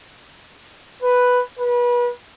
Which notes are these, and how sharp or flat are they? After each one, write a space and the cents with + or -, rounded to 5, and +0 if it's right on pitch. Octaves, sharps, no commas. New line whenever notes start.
B4 +0
B4 -30